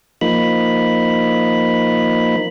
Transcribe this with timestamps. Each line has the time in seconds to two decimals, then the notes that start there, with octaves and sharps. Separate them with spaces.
0.21 F3 A#3 D#4 B5